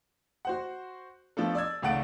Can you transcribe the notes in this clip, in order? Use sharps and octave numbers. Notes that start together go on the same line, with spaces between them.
F#4 C5 F#5
F3 A3 B3 D4 F4 A4
D5 E6 G#6
G#1 C#2 A3 F#5 A6 D7